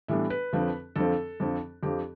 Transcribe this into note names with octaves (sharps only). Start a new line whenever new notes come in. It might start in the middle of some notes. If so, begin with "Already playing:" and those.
A2 E3 G3 B3 D4 E5
B4
F2 D3 F3 C4
F2 D3 F3 C4 A4
F2 D3 F3 C4
F2 D3 F3 C4 G4